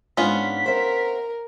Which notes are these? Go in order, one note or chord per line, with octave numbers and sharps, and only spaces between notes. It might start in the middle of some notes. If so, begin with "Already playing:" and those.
G#2 B3 C#4 D4 F4 B6
A#4 C5 E5